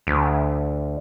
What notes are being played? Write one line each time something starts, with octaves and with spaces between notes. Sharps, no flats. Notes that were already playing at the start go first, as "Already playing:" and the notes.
D2